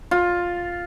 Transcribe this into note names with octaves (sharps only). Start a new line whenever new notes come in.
F4